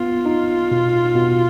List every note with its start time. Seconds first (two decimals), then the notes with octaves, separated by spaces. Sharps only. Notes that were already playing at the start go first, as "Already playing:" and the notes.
Already playing: B3 F4
0.26 D#4
0.71 B2
1.15 B2